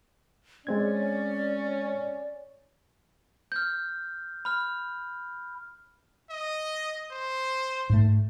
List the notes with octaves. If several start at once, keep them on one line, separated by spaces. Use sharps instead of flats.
G#3 C4 C#4 D5 G#6
F6 G6
B5 F6
D#5
C5
G#2 A3